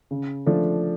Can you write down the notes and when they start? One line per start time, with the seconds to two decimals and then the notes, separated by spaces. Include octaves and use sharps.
0.11 C#3
0.46 F3 A3 D4